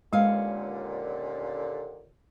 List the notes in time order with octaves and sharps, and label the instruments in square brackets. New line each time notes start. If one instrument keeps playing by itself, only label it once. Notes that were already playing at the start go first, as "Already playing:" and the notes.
[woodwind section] D#2 A#2 D3 [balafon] G#3 [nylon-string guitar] B3 C#4 F5